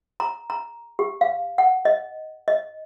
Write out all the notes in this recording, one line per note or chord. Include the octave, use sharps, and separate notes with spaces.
A#5
A#5
G4
F5
F#5
D#5
D#5